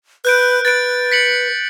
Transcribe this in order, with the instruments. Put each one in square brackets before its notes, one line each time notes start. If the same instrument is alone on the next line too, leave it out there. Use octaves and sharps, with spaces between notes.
[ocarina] B4 [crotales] F#6 G6 D7
[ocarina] B4 [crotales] A6 D7
[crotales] B6 C#7 F#7